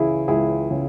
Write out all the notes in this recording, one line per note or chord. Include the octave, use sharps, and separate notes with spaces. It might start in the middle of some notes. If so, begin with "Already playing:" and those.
Already playing: C#2 C#3 E3 E4 G#4
C#2 E4 G#4
C#3